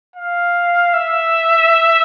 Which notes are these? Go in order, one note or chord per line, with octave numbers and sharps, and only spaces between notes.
F5
E5